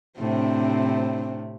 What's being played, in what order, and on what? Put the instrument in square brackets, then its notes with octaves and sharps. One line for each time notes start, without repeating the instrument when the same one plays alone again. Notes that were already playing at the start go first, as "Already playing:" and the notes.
[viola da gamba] A2 C3 [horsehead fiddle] C4 D4